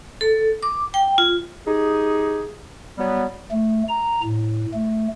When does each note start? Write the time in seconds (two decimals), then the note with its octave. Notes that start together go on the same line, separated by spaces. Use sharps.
0.21 A4
0.63 D6
0.94 G5
1.18 F4
1.67 D#4 G4 G#4
2.98 F#3 G3 B3
3.52 A3
3.89 A#5
4.23 A2
4.74 A3